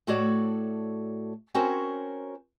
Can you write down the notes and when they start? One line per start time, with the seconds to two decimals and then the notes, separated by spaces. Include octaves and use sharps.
0.07 A2 A3 F#4 A4 C#5 D5
1.54 C4 C#4 F#4 A#4 C5 C#5